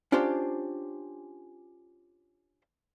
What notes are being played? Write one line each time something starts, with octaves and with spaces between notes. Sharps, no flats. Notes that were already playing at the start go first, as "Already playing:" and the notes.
C#4 D4 F4 G4 C5 G5